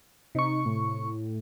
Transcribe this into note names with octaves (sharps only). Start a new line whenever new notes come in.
C3 D#4 C#6
A2